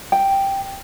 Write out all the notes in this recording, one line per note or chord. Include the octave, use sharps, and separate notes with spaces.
G5